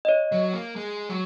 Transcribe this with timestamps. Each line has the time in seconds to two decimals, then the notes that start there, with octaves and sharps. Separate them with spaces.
0.05 D#5
0.09 C#5
0.32 F#3
0.53 A#3
0.76 G#3
1.09 F#3